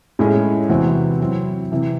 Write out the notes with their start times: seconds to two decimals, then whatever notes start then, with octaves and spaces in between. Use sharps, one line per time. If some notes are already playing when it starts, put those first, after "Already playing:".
0.19 A2 G#3 C#4 E4 G#4
0.69 E2 C3 E3 C4 F#4
1.20 F#3 C4 E4
1.71 C3 E3 C4